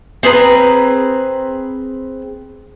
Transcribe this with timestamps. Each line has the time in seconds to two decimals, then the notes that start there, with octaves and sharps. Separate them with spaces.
0.23 C4 G#4 B4 A#5